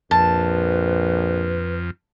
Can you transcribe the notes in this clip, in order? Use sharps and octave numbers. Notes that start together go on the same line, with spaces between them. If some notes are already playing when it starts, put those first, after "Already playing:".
A#1 F2 B4 A5